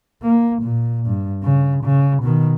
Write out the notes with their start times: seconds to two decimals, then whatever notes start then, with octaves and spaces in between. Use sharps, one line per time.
0.23 A#3
0.62 A#2
1.07 G2
1.43 C#3
1.84 C#3
2.23 B2 D#3